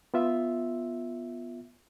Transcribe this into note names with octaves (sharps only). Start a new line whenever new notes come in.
B3 F4 E5